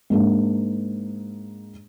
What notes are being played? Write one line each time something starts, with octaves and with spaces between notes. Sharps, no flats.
G#2 A#3 D4